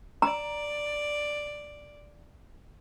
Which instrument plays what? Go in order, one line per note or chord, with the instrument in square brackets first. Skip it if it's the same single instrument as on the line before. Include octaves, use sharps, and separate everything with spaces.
[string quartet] D5 [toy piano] A#5